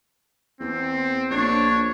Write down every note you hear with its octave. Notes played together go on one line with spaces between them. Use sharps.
E2 C4
A#1 D4 C#5